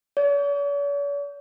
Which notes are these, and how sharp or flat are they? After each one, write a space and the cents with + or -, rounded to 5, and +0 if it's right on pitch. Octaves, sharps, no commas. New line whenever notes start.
C#5 +45